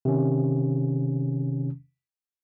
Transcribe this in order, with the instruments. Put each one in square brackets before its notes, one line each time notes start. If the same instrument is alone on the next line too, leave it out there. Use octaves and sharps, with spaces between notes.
[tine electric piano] C3 D#3 C#4